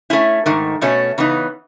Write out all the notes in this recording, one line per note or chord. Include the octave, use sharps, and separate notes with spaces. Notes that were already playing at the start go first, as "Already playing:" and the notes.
A3 C#4 E4
G#2 D#3 A3
B2 A3 C#4 F#4 C#5
C#3 E3 B3 D#4